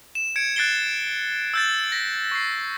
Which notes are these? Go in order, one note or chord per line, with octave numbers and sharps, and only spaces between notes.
E7
G#6 C#7 D7
F#6 A6 C7 D7 G7
E6 G6 A6
A#6 B6
C#6 C7